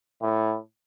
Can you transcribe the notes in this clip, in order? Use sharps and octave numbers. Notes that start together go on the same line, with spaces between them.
A2